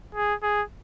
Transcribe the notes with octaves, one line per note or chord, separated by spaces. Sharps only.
G#4
G#4